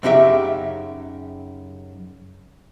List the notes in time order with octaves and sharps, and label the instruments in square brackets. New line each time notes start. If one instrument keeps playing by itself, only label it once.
[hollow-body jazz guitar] F#2 C#3 D#4 G4 E5